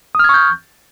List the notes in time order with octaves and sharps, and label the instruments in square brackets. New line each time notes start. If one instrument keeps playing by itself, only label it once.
[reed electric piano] D#6
F6
G#6
C#6
G6